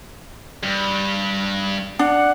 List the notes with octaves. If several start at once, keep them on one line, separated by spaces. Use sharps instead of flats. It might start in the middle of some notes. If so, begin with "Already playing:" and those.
G2
D4 F#5